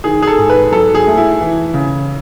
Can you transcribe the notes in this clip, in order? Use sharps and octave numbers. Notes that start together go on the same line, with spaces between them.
D#3 G#4
G#4
A4
G#2
B4
F#3 A4
G#4
A3
E4
E3
C#3